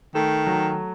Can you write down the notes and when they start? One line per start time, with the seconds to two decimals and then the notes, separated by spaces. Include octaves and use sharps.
0.15 D#3 A3
0.47 F#3